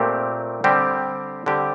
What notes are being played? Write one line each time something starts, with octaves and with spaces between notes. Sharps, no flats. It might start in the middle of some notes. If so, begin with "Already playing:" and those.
Already playing: A#2 A3 C4 G4
D3 G3 C4 G4
D3 G3 C4 G4